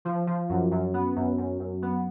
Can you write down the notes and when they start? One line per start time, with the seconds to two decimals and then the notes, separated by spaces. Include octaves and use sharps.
0.05 F3
0.27 F3
0.49 F#2
0.71 F#2
0.94 B3
1.16 F#2
1.38 F#2
1.60 F#2
1.82 B3